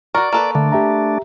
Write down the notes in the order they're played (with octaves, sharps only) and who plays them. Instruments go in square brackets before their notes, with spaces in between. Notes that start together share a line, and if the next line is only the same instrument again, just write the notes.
[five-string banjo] F#4 A#4 [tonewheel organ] D5 [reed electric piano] C#6
[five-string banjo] A#3 A4 B4
[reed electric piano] D3 [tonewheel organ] A3 D4
[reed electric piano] G4 E5 A#5